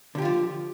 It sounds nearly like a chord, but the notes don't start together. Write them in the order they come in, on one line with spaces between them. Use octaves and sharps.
D3 G4 F4 F3